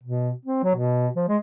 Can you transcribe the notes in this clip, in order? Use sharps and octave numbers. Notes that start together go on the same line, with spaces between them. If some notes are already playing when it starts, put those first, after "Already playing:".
B2
C4
F#3
B2
F3
G#3